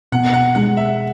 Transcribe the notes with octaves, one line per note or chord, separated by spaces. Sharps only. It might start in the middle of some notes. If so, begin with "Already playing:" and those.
B2 F#5
F#5
G#3 F#5
E5